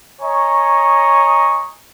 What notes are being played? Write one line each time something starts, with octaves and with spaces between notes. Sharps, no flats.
C#5 D#5 G#5 A#5 C#6